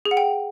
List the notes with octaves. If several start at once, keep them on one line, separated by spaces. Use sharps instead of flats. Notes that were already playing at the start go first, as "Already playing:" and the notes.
G#4
F#5
G5